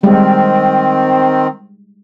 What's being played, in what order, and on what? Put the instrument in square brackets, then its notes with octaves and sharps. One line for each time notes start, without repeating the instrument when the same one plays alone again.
[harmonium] D#3 C4 [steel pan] G3 G#3